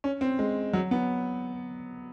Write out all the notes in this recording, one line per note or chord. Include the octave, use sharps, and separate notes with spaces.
C#4
C4
G#3
F#3
B3